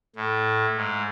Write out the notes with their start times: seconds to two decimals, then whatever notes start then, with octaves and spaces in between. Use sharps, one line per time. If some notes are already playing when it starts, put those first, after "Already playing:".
0.16 A2
0.77 G#2